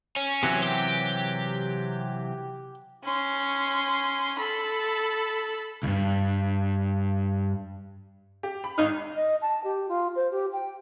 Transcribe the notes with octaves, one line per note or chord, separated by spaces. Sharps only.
C#4
C3 E3 F#3
G4
C#4 C6
A4 B5
C#2 G2
G4
B5
G#1 D#4 F6
D#5
A5
G4
F4
C5
G4
G5